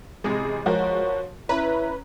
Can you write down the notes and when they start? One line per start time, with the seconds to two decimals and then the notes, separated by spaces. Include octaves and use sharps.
0.24 A1 C3 G#3 G#4
0.66 F3 F#4 A#4 C#5
1.49 C#4 E4 B4 A#5